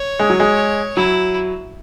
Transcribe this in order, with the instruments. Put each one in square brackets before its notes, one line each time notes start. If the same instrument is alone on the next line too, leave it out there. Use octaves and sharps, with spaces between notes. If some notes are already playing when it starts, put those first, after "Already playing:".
Already playing: [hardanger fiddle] C#5
[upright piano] G#3
F#3
G#3
[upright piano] F#3 [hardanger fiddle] E4